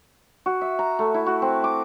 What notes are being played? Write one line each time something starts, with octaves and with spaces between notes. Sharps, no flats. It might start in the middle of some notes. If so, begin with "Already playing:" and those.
F#4
E5
A#5
A3
E4
F#4
C4
D6